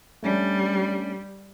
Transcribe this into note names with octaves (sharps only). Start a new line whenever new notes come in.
G3 A3 C#4 D4